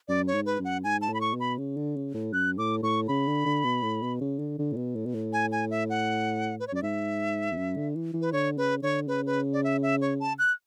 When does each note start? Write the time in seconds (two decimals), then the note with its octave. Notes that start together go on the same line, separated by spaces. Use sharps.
0.08 F#2 D5
0.27 C#5
0.33 G#2
0.46 B4
0.59 F#2
0.65 F#5
0.84 G#2 G#5
1.01 A5
1.09 A2
1.14 B5
1.21 C#6
1.33 B2
1.40 B5
1.58 C#3
1.77 D3
1.96 C#3
2.14 A2
2.33 F#2 F#6
2.58 A2 D6
2.83 A2 C#6
3.08 C#3 B5
3.27 D3
3.45 D3
3.64 B2
3.82 A2
4.02 B2
4.21 C#3
4.39 D3
4.59 D3
4.72 A2
4.76 B2
4.95 A2
5.06 B2
5.14 A2
5.33 G#5
5.52 G#5
5.71 E5
5.90 F#5
6.60 B4
6.68 C#5
6.72 F#2 D5
6.82 G#2 E5
7.51 E2
7.57 F#2
7.76 D3
7.95 E3
8.13 E3
8.21 B4
8.32 D3 C#5
8.57 C#3 B4
8.82 D3 C#5
9.07 C#3 B4
9.26 B4
9.53 D5
9.64 E5
9.82 E5
10.01 C#5
10.20 A5
10.39 F#6